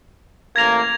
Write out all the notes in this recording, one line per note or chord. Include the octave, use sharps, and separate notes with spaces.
A1 A#3 G#6 A#6 F7